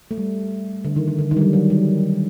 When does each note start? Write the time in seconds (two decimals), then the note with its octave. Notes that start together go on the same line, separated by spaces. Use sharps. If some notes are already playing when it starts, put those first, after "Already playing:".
0.11 A3
0.18 G3
0.85 D3
0.96 D#3
1.08 D#3
1.19 D3
1.31 D#3
1.37 G3
1.41 F#3
1.53 F#3
1.70 G3